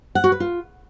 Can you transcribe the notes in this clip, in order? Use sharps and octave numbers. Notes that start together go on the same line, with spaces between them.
F#5
F#4
B4
F4